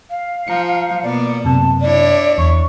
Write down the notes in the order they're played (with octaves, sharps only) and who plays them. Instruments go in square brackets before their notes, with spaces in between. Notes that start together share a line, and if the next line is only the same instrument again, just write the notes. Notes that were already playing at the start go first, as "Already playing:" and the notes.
[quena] F5
[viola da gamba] F3 [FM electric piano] A#5 C#7
[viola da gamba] B2 A#3 B3 [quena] D5
[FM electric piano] F#2 C3 [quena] A5
[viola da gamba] D4 E4 C#5 [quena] D5
[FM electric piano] E2 [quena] C#6